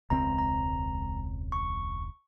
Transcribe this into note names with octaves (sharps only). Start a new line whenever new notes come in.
E1 C#2 C4 A#5
A#5
C#6